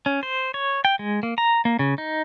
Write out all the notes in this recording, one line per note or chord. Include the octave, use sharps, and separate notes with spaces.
C#4
C5
C#5
G5
G#3
A#3
A#5
A#3
C#3
D#4